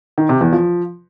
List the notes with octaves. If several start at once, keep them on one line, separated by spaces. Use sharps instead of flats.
D#3
C3
E2
F3